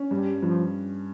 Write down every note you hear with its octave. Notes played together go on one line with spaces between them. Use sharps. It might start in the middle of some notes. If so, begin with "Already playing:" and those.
Already playing: C#4
G2 G3
G2 F3